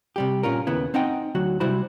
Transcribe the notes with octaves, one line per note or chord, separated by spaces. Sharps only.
C3 G3 G4
A#2 C#4 F4 A#4
D#2 C#3 B3 E4
C4 D#4 D#5 F#5 G5
D2 F#3 F#4
C3 G3 E4 F#4 C5 B5